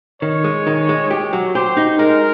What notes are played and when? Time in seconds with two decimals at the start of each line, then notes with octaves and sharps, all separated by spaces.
0.22 D#3 C#5
0.44 G#3
0.67 D#3
0.89 G#3
1.11 G4
1.33 F#3
1.55 G4 C5
1.77 D#4
1.99 G#3 A#4